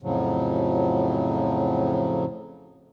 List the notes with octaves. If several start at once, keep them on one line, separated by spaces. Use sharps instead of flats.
F2 A2 C#3 F3 F#3